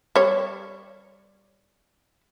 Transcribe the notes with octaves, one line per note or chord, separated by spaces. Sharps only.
G3 C#5